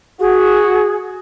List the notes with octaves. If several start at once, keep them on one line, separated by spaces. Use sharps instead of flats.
F#4 G#4